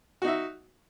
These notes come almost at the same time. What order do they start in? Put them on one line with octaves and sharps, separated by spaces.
F#4 D#4 E5